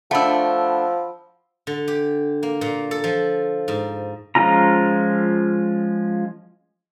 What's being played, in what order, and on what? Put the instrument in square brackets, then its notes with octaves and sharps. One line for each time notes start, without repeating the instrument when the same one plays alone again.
[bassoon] F3 [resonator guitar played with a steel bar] A3 D4 [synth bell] F#5 B5 E6
[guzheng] D3
G4
A#3
A#2
A4
F3
G#2
[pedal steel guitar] F3 G#3 C#4 F4 A#5